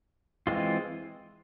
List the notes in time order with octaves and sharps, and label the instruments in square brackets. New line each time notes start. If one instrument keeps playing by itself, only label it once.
[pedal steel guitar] E3 G#3 C4 F4